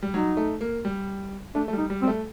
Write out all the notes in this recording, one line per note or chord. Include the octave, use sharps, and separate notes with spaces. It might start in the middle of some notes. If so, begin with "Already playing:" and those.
G3
F#3 D#4
A3
A#3
G3
A3 D4
A3
G3 D#4
G3
G3 C4
A3